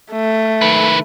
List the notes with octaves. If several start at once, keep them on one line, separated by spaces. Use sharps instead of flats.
A3
D#3 B4